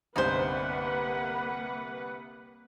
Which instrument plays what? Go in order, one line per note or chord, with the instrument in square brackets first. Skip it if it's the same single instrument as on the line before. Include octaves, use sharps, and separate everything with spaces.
[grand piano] G1 C2 [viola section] A#3 B4 F#5 [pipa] D#4 G#4 C5